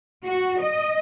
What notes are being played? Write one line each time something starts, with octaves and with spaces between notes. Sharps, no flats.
F#4
D#5